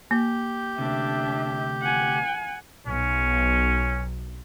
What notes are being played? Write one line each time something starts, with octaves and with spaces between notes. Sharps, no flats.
A#3 G4 G6
D2 C3 D4 E5
F#5 G#5
B1 C#4